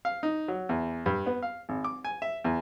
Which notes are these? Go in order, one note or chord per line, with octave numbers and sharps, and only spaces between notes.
F5
D#4
F#3
E2
G2
B3
F5
G#1
D6
G#5
E5
E2